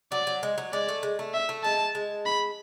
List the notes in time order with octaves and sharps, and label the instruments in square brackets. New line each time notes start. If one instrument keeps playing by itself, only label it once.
[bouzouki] F#3 [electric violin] D5
[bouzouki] F#3
G#3
F#3
[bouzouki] G#3 [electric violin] D5
[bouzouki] A3
G#3
A3
[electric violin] E5
[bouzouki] A3
[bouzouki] G#3 [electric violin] A5
[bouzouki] G#3
[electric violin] B5